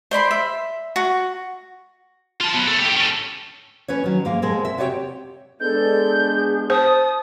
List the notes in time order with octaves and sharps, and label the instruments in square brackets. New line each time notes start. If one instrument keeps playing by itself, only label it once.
[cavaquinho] C5 D5 B5 C6
E5
F#4
[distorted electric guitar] F4 A5
F#3 B3
A3 A4
A2 G4
C#4 A4
[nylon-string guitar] C#4 B4 C#5
D#3 F#3
G#2 A#3 F5
B2 G#3 C4 G#4 A#4
E5
C3 F#4 G4 C#5 D5 G5
[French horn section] G#3 B3 D4 [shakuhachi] A4 [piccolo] G6
[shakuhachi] G#4
[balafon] C5 [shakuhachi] A5 [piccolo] D#6